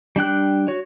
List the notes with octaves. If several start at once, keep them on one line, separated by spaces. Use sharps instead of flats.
G3 D4 G5 F#6
F#4 C#5